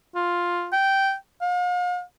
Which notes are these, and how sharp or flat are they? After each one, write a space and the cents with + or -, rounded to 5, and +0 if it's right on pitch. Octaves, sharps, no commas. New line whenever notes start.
F4 +5
G5 -10
F5 +40